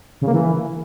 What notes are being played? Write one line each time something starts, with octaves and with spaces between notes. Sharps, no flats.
C#3
A#3
E3